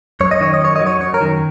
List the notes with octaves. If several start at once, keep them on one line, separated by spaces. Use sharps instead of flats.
F#2 C#5
D#5
D#3 C#5
D#5
F#2 C#5
F#3 D#5
C#5
F#2 C#5
A#4
D#3